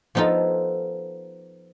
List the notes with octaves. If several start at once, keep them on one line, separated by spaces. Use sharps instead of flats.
F3 B3 D#4 F4 A4